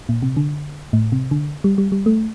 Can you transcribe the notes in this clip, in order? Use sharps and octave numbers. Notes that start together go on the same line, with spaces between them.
A#2
C3
D3
A2
C3
D3
G3
G3
G3
A3